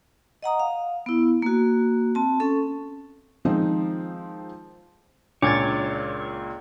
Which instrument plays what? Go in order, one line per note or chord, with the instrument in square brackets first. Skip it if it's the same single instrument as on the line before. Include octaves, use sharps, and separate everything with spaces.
[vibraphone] D#5 F#5 A#5 D#6
F5
B3 E4
A#3 F#4
C4 A5
C#4 A4 C#6
[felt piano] D#3 F3 G#3 C4 D#4
[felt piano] C#2 A#2 [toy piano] D4 [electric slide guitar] C#5 [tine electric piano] D6 G#6 A6